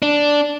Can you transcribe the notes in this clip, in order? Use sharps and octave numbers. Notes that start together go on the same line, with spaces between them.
D4